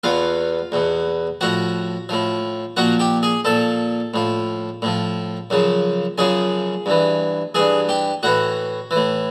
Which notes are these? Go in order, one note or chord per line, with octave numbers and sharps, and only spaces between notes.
E2 B2 F4 F5
E2 B2
A2 F3 F#4 F#5
A2 F3
A#2 F3 F#4 F#5
G4 G5
G#4 G#5
A#2 F3 A4 A5
A2 F3
A2 F3
F#2 C#3 F3
F#2 C#3 F3 G#4 G#5
G2 E3
G2 E3 G#4 G#5
G4 G5
A2 E3 F#4 F#5
E3
A2